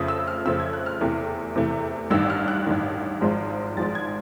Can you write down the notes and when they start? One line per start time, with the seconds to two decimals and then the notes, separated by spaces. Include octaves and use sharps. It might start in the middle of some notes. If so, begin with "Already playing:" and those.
Already playing: F2 C#3 F3 A3 D#6
0.08 E6
0.27 F6
0.45 F2 C#3 F3 A3 E6
0.60 G#6
0.73 F#6
0.86 F6
1.01 E2 C3 E3 A3
1.56 E2 C3 E3 A3
2.10 A1 G2 D#3 E6
2.30 F6
2.48 F#6
2.66 A1 G2 D#3
3.21 G#1 G#2 F3 G#3
3.77 G#1 G#2 F3 G#3 A6
3.95 G#6